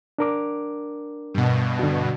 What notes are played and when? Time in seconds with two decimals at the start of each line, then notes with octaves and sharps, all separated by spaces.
0.18 D4 A#4 D6
1.34 G2 B2
1.79 D3 F#4